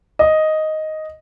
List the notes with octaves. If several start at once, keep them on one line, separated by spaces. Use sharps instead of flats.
D#5